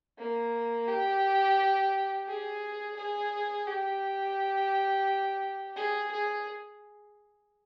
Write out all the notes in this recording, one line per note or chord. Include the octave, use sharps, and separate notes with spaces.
A#3
G4
G#4
G#4
G4
G#4
G#4